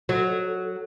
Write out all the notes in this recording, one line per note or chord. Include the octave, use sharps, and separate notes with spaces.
F#3 A4